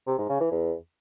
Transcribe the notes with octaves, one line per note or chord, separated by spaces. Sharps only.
C3
G#2
C#3
E3
E2